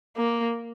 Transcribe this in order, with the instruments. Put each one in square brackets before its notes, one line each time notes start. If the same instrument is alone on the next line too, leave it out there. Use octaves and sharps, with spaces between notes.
[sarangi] A#3